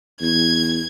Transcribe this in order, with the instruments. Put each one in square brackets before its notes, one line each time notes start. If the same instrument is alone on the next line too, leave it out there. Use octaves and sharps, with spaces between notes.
[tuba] E2 [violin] G#6